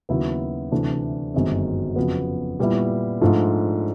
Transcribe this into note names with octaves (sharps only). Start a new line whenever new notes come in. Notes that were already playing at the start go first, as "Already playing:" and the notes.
D#2 C#3 F#3 B3 E4
D2 C3 E3 A3 D4
G1 F#2 D#3 G#3 C4
F2 C#3 F#3 B3
A#2 G3 B3 E4
G#2 F3 A3 D4 F4